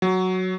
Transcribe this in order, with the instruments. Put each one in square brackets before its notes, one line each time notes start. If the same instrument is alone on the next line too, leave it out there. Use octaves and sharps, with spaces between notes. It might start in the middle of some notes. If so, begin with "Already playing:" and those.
[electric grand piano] F#3